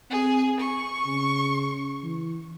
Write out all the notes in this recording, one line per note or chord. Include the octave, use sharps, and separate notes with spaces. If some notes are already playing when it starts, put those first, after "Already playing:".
C4 G#4
C#6
C#3
E3